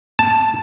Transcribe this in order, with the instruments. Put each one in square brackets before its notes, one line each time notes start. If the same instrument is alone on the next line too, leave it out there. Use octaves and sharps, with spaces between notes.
[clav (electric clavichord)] A5